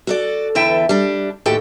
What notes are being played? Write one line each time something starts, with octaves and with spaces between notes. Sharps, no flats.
F#4 A4 D5
E2 D3 E3 A4 E5 G5
G3 D4
D#2 A2 F#4 G4 A4 G5